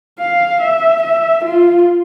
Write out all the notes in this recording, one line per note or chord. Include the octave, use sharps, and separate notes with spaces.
F5
E5
E5
F4